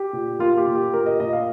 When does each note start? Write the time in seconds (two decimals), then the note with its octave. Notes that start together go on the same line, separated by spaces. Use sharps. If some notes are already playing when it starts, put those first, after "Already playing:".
Already playing: G4
0.13 A#2
0.39 A#3 F4
0.57 G4
0.67 A#2
0.75 G4
0.93 A#2 A#4
1.06 D#5
1.20 A#2 D#5
1.33 F5